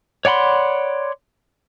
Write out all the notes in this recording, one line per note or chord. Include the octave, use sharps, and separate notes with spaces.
C#5 D5 F#5 B5 C6